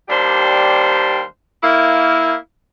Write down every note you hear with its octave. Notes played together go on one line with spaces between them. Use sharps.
D#2 G3 D4 G4 C5
A#3 E4